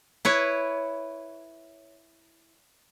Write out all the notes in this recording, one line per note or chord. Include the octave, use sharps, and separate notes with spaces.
E4 B4 C#5